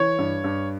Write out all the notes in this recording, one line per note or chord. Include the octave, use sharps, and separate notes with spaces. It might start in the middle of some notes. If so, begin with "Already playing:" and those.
Already playing: E3 C#5
G2
G2